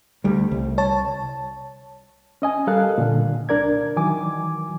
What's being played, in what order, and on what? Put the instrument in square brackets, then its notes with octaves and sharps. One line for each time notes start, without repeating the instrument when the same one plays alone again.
[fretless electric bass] D2 G3
C2
[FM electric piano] C#5 A5
[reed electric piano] C#4 D#5 G#5
G3 A4 A#4 F5 F#6
A#2 D3
C2 D4 A#4 D5 G#6
D#3 E3 F#3 G#5 D6